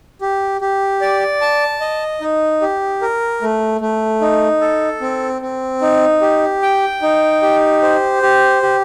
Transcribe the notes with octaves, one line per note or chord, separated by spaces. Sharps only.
G4
G4
D5
A5
D#5
D#4
G4
A#4
A3
A3
D#4
A4
C4
C4
D#4
G4
G5
D#4
G4
C5
G4
G4